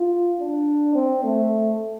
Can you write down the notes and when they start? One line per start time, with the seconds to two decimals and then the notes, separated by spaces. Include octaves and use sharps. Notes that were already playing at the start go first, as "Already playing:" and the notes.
Already playing: F4
0.40 D4
0.95 C4
1.24 A3